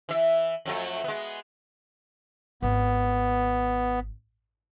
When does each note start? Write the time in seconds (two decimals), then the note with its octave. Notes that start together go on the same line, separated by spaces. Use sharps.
0.09 E3 E5
0.65 F2 F#3 A3
1.04 G#3 B3
2.62 G#1 B3